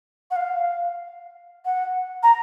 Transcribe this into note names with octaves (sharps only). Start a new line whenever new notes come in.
F#5
F5
F#5
A#5